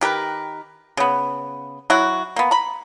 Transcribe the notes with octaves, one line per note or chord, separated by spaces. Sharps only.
D#3 G4 A#4 B4
C#3 B3
F#3 E4 F#4
A#3 B3
A#5 B5